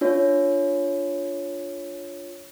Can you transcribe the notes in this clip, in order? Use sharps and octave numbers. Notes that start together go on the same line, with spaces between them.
D4 F4 C#5